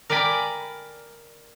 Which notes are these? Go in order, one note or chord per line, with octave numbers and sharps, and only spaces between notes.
A#4 D5 G5 G#5 B5